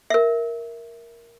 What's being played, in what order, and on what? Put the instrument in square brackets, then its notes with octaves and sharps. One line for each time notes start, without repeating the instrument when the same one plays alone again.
[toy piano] A#4 E5